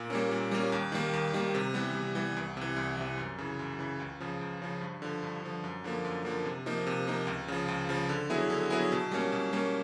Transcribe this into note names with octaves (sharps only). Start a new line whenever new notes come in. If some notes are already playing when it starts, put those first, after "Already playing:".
Already playing: A#2
G3 A#3 C#4
A#2
G3 A#3 C#4
D#2
D#3 G3 A#3
D#2
D#3 G3 A#3
C3
E3 G3 B3
C3
E3 G3 B3
C2
C3 E3
C2
C3 E3
F#2
C#3 E3
F#2
C#3 E3
C#2
C#3 F3
C#2
C#3 F3
G2
D3 F3
G2
D3 F3
F#2
D3 F3 A#3
F#2
D3 F3 A#3
C3
F3 A#3 D#4
C3
F3 A#3 D#4
C#2
C#3 F3
C#2
C#3 F3
D3
F#3 B3 E4 G#4
D3
F#3 B3 E4 G#4
B2
G3 A#3 C#4
B2
G3 A#3 C#4